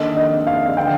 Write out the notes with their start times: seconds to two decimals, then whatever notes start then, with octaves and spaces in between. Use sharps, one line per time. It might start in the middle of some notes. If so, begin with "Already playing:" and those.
Already playing: D#3 A#3 D4 A4 D#5
0.17 D#5
0.47 F5
0.77 D3 G5